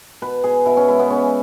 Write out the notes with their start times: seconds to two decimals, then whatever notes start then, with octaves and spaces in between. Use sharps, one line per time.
0.22 B2 B4
0.44 B2 G#4
0.66 B2 E4
0.77 C#4
0.88 G#3 E4
0.99 B3
1.10 G#3 C#4